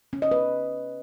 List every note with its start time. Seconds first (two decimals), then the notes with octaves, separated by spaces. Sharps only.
0.13 C#4
0.22 D#5
0.31 B4